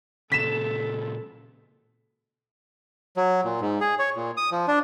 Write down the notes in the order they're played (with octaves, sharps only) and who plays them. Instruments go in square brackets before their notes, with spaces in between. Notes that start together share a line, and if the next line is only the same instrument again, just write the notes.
[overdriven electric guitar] A#2 C#3 [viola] A4 [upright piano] B6 E7
[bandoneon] F#3
A#2
G#2
G#4
C#5
A#2
D#6
F3
D4